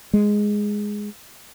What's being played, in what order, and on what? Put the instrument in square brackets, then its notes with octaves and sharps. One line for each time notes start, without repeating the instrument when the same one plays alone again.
[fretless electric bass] G#3